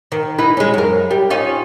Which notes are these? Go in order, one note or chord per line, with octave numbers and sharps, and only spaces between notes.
D#3
D#4 E4 B4
G#3 C#4
F#2 A#4
G3
C#4 D#4 F4